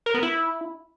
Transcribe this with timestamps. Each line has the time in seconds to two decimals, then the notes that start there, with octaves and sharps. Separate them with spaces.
0.06 A#4
0.14 B3
0.23 E4